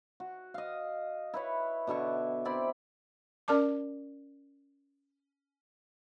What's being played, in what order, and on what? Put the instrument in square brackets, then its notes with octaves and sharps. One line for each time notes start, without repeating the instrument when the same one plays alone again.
[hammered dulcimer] F#4
D#5 F5
E4 B4 C#5
B2 D3 E4 C#6
C4 E4 D5 B5
[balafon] C#4 A#4 D5 A5 D6